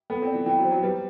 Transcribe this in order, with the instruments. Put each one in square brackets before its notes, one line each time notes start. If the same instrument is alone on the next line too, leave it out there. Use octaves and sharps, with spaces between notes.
[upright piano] B3 [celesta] A4
[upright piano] C4 [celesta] D5
[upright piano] E3
[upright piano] E3 [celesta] G5
[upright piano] F#3
[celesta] C5
[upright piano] F#3
[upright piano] G3 [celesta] B4